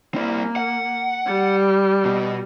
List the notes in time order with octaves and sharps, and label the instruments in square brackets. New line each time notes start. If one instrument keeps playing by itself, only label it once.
[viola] A#3 [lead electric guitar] C4 E4
[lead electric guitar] F#5
[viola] G3
[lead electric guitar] B2